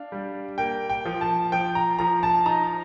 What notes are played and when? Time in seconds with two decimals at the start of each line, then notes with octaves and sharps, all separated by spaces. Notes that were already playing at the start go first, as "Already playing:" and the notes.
Already playing: D4 F5
0.12 G3
0.58 A#3 G5
0.90 G5
1.05 F3
1.21 A5
1.52 F3 G5
1.75 A#5
1.99 F3 A#5
2.23 A5
2.46 D#4 A#5